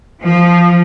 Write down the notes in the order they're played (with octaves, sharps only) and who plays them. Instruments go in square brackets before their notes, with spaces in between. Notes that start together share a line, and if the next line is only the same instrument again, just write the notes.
[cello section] F3